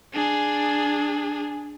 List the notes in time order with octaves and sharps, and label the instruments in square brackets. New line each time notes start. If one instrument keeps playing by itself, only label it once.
[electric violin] D4 G#4